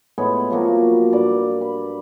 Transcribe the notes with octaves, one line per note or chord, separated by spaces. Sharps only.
A2 G#3 B3 C#5
F3 F#3 A#3 F#4
G2 D5 D6
B5